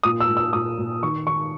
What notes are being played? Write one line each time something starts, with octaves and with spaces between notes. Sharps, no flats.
A#2 D#6
E6
A#2
E6
A#2 D#6
A#2
D#3 C#6
D#3 C#6